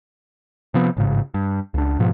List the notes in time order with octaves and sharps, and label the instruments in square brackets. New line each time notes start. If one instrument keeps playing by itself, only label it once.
[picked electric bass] C3 F3 B3
A1 G#2 C#3
G2
C#2 D4
G#2 B2 F3